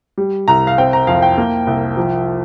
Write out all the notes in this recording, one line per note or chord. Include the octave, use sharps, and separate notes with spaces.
G3
C2 A#5
F5
C4 G5
A#5
F2 F5
G5
A#3
C2
F3